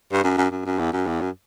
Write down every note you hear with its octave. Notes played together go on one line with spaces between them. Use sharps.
G2
F#2
F#2
F#2
F#2
E2
F#2
E2
F#2